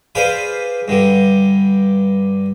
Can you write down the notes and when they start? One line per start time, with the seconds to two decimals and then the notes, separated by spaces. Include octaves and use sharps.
0.15 G#4 B4 C5 D5 F5
0.88 G2 D3 G3